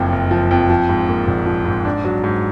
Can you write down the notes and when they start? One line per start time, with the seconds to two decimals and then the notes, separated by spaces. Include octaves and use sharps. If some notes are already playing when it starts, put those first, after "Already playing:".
Already playing: F#1 F2 F3
0.12 F#1
0.31 F3
0.51 F2
0.70 F3
0.89 G#2
1.09 A#3
1.28 A#1
1.46 F3
1.66 G#2
1.85 D4
2.05 F#3
2.24 G#2